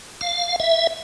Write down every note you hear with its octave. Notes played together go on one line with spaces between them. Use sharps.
F5
E5